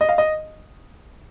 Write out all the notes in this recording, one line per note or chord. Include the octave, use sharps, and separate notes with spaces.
D#5
F5
D#5